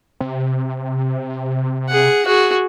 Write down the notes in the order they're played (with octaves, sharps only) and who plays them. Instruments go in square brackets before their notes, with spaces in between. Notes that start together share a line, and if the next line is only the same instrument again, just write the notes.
[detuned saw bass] C3
[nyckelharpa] G#4 F#5
F#4 G#4